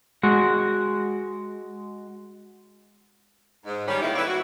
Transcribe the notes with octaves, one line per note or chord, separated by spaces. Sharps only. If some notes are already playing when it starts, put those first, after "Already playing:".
G#3 F#4
G#2
D#3 G3 C#4
A#2 D#3 G#3 A#3 E4
C4 E4 A4 B4 C#5 D5
F#4